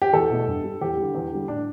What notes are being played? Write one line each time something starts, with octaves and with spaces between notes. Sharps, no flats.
G4
E2 A4
B2 A3
G2
G3
E2 G4
D3 G3
E2
D3 G3
A2 D4